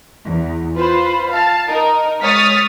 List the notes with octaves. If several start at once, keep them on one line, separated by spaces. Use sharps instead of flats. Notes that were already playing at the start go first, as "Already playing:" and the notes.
E2
F4 B4 C5 B5
F5 A5
D#4 A#4
G#3 C#5 D#6 F6 A6 B6